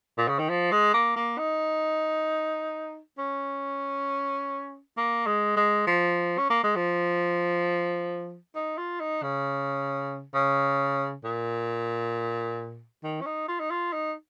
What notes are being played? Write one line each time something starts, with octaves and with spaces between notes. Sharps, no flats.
A#2
C#3
D#3
F3
G#3
A#3
A#3
D#4
C#4
A#3
G#3
G#3
F3
C#4
A#3
G#3
F3
D#4
F4
D#4
C#3
C#3
A#2
D#3
C#4
D#4
F4
D#4
F4
D#4